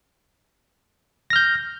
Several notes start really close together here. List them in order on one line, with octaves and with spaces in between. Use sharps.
A#6 F6 G6